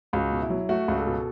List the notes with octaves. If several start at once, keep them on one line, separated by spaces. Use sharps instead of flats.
C#2 F#4
B2
E4
F#3
A3 F#4
C#2
A4
B2